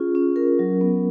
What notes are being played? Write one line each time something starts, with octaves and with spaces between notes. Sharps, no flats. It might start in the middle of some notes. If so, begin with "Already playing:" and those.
Already playing: C#4 F4 G#4
C#4
A#4
F#3
B3